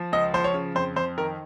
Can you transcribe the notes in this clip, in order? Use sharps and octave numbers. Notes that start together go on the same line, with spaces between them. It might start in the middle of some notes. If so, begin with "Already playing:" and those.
Already playing: F3
C#2 D#5
F3 C5
C#5
C#3
F2 C5
F2 C5
D#3 A#4